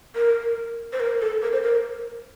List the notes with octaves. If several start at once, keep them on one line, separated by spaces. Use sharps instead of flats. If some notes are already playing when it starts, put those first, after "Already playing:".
A#4
C5
A#4
A4
A#4
C5
A#4